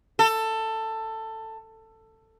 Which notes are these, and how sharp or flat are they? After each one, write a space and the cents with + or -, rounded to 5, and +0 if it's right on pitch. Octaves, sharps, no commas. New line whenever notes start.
A4 +15